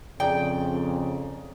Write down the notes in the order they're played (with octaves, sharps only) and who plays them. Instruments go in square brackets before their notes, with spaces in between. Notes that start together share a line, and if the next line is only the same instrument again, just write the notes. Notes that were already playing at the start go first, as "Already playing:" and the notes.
[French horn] F2 [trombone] C#3 [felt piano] G#4 D5 A#5 [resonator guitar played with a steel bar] G5